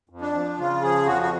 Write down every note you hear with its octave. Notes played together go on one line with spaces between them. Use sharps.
F2
D4
F3
C#3 F4
F3 G#4
F2 F#4
F#4